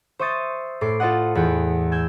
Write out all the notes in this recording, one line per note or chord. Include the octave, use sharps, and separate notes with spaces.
C5 E5 C#6 D#6 G6 A6
A2 A4 D6 C7
F4 A4 C5 D#5 F#5
E2 F#5 G5 D7
G#5 E6 G6 G#6